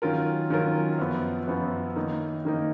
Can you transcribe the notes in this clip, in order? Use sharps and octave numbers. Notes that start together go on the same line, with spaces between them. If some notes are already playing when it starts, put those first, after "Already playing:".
D#3 F#3 C#4 F4 A#4
D#3 F#3 C#4 F4 A#4
F#2 F3 B3
F#2 F3 B3
D#3 A#3 D#4
D#3 A#3 D#4